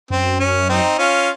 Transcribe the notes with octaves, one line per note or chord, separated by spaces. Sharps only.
F#2 C4
C#4
C4 D#4
C#4 F4